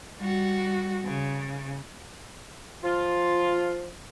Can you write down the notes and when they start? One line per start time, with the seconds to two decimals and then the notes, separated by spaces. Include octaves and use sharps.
0.19 G3 F#4
1.05 C#3
2.84 F3 F4